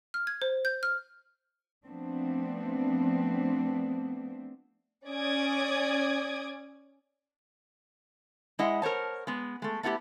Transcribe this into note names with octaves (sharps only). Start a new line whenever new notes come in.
F6
G#6
C5
G6
F6
F3 A3 B3 C4 D4
C#4 D5 D6 D#6 G#6
G#3 E4 D#5 E5 F#5
A#4 C5 C#5 A5
G#3 B3
G#3 A3
A3 B3 E4 F4 G4